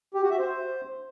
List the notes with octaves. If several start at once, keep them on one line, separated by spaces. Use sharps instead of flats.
G4
F#4
E5
C5